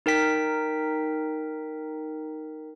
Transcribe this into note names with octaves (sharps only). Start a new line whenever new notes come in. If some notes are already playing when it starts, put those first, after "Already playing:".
D#4 A#4 G5 B6